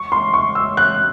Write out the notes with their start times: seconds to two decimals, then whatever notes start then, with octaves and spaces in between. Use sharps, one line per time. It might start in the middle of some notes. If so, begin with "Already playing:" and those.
Already playing: C#6
0.12 C6
0.34 C#6
0.55 E6
0.77 F#6